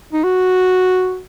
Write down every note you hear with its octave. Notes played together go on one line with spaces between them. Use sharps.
D#4
F#4